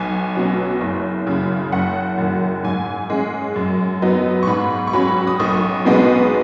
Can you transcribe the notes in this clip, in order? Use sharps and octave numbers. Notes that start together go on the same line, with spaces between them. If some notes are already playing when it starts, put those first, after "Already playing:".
Already playing: B1 G#5
B2 F#3 C#4
F#1
F#2 C#3
F#1 F#5
F#2 D#3
G#2 G#5
G#3 C#4
F#2
F#3 B3 D#4
C#6
G#2 B5
C#6
F#3 C#4 B5
D#6
B1 C#6
B2 G#3 B3 D#4